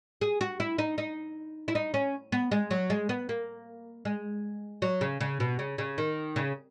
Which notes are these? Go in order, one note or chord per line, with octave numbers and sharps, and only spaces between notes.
G#4
F#4
E4
D#4
D#4
E4
D#4
C#4
B3
G#3
F#3
G#3
B3
A#3
G#3
F#3
C#3
C#3
B2
C#3
C#3
D#3
C#3